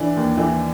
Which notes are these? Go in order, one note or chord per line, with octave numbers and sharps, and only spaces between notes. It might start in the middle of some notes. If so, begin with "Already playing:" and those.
Already playing: E3 D4
D#2
E3